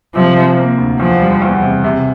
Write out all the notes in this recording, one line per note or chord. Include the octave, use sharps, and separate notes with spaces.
C3 F3
C3
A#3
D2
E2 F3
G3
E2
C3
C3